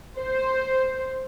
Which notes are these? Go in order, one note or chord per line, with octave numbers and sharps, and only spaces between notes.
C5